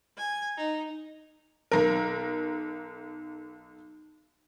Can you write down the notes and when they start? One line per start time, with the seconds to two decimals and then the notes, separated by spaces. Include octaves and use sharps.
0.18 G#5
0.57 D#4
1.72 B1 A#4